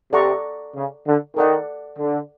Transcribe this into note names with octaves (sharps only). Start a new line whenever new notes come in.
C3 A4 D5 F#5 A#5 C#6
C#3
D3
D#3 A4 D5 F#5
D3